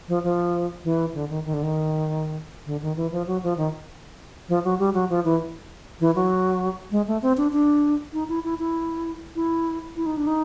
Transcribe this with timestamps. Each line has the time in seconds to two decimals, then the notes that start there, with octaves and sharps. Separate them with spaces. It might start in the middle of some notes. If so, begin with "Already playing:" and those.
0.08 F3
0.24 F3
0.84 E3
1.14 D3
1.29 D#3
1.45 D#3
1.54 D3
1.63 D#3
2.66 D3
2.82 D#3
2.97 E3
3.12 F3
3.27 F#3
3.43 F3
3.57 D#3
4.49 F3
4.64 F#3
4.79 G3
4.94 F#3
5.10 F3
5.25 E3
6.00 E3
6.16 F#3
6.91 G#3
7.07 A3
7.22 C4
7.37 D4
7.53 D4
8.13 D#4
8.29 E4
8.44 E4
8.59 E4
9.36 E4
9.96 E4
10.06 D#4
10.17 D4
10.27 D#4